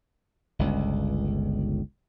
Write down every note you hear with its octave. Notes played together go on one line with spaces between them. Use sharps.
G1 C#2